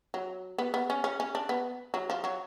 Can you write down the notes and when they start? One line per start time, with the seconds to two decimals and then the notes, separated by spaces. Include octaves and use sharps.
0.14 F#3
0.58 B3
0.74 B3
0.90 C#4
1.04 C#4
1.20 C#4
1.35 D4
1.49 B3
1.94 F#3
2.10 F3
2.24 F#3